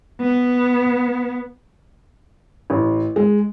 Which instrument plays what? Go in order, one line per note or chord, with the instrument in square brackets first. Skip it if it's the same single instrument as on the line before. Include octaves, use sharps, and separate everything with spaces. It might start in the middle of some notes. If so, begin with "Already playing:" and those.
[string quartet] B3
[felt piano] A1
G#3